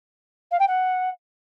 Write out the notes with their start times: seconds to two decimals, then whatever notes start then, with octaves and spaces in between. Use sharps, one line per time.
0.51 F5
0.59 G5
0.68 F#5